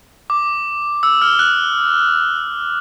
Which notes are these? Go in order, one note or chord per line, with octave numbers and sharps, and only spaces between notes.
D6
E6
F6
F#6